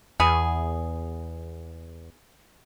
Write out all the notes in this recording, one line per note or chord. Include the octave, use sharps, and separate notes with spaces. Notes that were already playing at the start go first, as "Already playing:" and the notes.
E2 B3 G#4